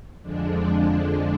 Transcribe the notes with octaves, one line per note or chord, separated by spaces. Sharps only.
F2 D3 F3 G#3 D4